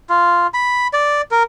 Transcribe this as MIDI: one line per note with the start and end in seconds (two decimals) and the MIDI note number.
0.10 0.47 65
0.54 0.87 83
0.93 1.21 74
1.31 1.43 70